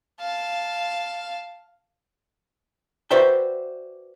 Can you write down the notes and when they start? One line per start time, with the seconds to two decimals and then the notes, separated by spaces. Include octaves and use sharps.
0.20 F5 A5
3.11 F#4 B4 C5 D5 E5 G5